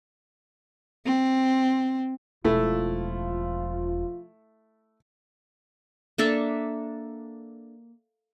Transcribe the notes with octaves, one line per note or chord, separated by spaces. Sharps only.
C4
E1 F3 A3 E4 F4
A#3 D4 A4 E5